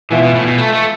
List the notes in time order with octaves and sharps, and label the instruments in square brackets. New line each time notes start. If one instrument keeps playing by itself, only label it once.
[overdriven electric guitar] B2 [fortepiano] E3 B3 F4 B4 E5
[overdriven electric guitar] B2
A2
B2
A3
A3